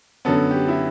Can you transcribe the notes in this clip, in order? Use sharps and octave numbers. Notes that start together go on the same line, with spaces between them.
F#2 D3 F#3 B3 A4
G4
E4